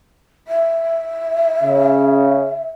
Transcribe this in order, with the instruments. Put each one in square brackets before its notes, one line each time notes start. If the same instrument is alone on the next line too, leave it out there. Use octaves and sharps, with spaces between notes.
[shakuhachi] E5
[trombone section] C#3